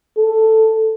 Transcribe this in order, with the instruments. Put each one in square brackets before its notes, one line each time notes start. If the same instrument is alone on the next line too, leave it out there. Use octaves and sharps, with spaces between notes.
[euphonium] A4